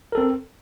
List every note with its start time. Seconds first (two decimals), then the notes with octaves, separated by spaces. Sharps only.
0.12 A#4
0.15 A4
0.18 C4